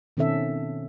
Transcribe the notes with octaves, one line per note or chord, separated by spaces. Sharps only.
B2 D#3 C4 C#4 A4 E5